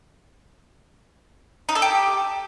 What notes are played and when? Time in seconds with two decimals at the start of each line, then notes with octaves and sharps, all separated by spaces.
1.69 D#4
1.75 A4
1.82 G4